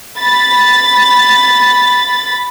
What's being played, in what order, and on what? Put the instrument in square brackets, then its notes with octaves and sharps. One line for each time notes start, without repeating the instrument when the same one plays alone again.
[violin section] B5 A6